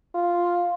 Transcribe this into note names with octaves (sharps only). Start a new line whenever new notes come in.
F4